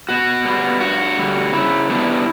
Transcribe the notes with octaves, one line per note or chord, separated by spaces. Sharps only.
B2 F#4
G3 B3
G2 F#4
D3 G3
C#3 E4
G3 B3 D4